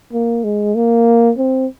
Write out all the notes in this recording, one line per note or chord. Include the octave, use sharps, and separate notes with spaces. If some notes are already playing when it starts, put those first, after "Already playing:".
A#3
G#3
A#3
C4